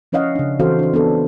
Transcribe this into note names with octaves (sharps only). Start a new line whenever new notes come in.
F3 C#4 C#5 D#5 F5 F#5
C#3 D4
E3 C4 F#4 A4 C5 F5
D4 C5
B3 D4 A4